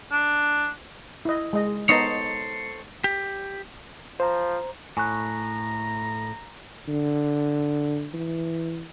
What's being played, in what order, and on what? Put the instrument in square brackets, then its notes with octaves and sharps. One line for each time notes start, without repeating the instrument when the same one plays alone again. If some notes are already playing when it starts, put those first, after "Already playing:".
[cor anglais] D4
[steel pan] E4 D#5
G#3 D#5
[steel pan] B3 D#4 D#5 [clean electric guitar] A4 C5 C#5
[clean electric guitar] G4
[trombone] F3 [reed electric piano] C5 A#5
[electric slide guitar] A2 [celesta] G#5 C#6 F#6 [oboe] A#5
[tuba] D3
E3